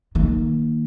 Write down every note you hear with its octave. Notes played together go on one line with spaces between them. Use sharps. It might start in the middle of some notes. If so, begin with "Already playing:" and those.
D#3 A#3